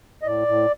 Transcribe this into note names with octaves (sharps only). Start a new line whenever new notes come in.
D#5
A2 D5
A2